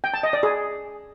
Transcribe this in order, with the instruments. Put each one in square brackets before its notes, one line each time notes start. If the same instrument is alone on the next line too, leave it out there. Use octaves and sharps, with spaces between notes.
[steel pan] G5
A5
D#5
D5
G#4